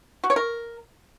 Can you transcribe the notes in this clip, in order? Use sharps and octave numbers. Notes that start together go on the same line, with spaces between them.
F#4
C#5
A#4